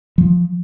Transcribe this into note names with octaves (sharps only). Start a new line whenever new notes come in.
F3